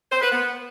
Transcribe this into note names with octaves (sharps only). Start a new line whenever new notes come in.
C5
B4
B3